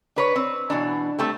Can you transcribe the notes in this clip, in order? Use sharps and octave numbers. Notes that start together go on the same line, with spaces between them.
D4 B4 C#5
C4
B2 E3 D4
G3 A3 C4